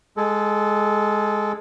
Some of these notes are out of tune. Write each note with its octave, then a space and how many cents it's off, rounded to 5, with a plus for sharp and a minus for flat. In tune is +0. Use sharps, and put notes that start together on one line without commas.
G#3 +0 A4 -20